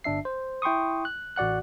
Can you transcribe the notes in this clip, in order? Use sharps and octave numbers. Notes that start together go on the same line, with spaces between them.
G1 D4 E5 C7
C5
E4 G5 C6 C#6 D#6
F#6
A1 F#4 D5 F#5 F#6